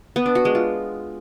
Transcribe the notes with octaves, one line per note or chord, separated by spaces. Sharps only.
B3
D4
F#4
G#3
F4